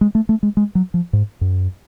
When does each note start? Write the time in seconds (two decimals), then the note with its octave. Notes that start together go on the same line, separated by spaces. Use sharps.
0.01 G#3
0.15 A3
0.29 A3
0.43 G#3
0.57 G#3
0.75 F#3
0.94 F3
1.13 G#2
1.41 F#2